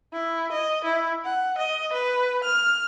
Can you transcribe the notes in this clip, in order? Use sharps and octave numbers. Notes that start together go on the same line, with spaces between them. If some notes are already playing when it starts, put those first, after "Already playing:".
E4
D#5
E4
F#5
D#5
B4
F6